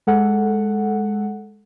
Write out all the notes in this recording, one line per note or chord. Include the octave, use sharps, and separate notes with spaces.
G#3 A4 F#5